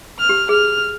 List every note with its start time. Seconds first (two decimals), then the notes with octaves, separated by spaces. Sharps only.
0.19 F6
0.29 G4
0.49 G#4 F6